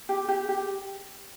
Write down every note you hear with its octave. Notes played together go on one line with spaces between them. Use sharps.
G4
G4
G4